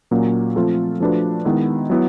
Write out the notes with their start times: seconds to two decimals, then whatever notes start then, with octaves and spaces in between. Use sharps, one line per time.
0.11 A#2 F#3 A#3 C#4
0.56 F3 A3 C4 F4 A4
1.00 F3 A3 D4 F#4 B4
1.45 D#3 G#3 B3 E4
1.90 F#3 B3 E4